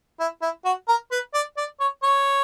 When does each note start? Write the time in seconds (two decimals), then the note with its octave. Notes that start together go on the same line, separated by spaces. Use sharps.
0.20 E4
0.42 E4
0.65 F#4
0.88 A#4
1.11 B4
1.34 D5
1.58 D5
1.80 C#5
2.03 C#5